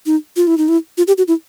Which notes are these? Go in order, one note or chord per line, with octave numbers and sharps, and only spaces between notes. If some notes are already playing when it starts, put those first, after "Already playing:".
D#4
F4
E4
D#4
E4
F4
G4
F#4
E4